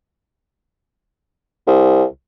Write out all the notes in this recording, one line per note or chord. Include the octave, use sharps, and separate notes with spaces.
C2